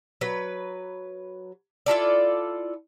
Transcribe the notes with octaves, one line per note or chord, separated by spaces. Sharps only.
F#3 B4
E4 F4 A4 D5